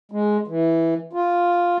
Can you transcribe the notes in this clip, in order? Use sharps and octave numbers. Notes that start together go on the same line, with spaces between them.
G#3
E3
F4